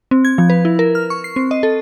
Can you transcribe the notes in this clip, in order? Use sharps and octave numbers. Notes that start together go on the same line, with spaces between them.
C4
G#6
F3
B4
E4
A#4
F6
C#6
C7
C4
D#5
A4